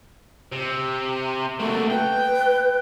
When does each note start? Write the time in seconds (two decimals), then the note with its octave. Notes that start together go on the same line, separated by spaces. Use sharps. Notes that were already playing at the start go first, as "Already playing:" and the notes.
0.52 C3
1.60 A3 A#3 F#4
1.90 B4 G5